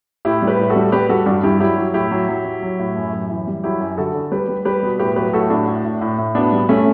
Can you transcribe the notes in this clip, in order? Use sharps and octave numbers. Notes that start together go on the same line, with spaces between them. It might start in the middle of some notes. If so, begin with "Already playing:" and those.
A2 E4 G4
G3
G4 B4
A2
F#4 A4
G3
G3 G4 B4
G3 F#4 A4
G2 D4 F#4
G2 E4 G4
F#3 E4 G4
F#3
A2 E4 G4
F#3
F#3
F#3
F#3
A2
F#2
F#2
E3
G3
F#3 E4 G4
F#2
D3 F#4 A4
D3
G3 G4 B4
G3
G3 G4 B4
B2
A2 G4 B4
F#3 G4 B4
A2 F#4 A4
A2 D4 F#4
A2
A2
A2
A2
B2 B3 D4
G3
G3 A3 C#4